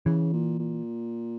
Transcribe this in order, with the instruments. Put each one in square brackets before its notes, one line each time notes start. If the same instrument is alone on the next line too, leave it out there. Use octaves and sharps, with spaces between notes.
[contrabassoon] C#3 [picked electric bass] E3
[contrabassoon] A#2
A#2